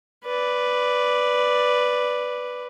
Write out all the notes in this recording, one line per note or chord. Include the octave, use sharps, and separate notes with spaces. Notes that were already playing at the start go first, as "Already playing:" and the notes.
B4 D5